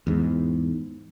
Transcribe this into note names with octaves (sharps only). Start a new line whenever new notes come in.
E2 G#2